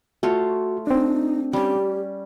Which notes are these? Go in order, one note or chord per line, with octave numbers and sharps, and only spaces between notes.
A3 F4 F#4 C#5
C4 D4 D#4
G3 C#4 G4